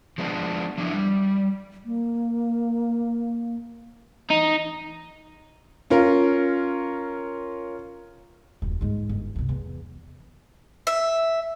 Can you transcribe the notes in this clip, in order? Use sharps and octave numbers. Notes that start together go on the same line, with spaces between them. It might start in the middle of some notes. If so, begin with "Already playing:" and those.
F3 G#3 B3 D4
F3 D4 E4
G3
A#3
E3 D#4
C#4 F4 A#4
D#1 F#2
G#2 G#3
G1
F#2 C3
E2
E5